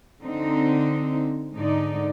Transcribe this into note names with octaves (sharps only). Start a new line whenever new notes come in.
D3 C4 D#4
G#2 D3 D#4 D5